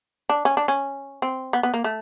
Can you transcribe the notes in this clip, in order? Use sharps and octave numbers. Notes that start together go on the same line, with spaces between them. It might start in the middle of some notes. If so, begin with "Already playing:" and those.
D4
C#4
D4
C#4
C4
B3
B3
A#3
A3